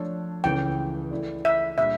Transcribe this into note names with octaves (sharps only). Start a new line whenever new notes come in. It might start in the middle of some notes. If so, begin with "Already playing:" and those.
Already playing: F3 A3 D4 A4 C#5
C#2 C#3 E3 A3 C#4 G5
E3 A3 E4 A4 D5
E5
A#2 G3 D4 E5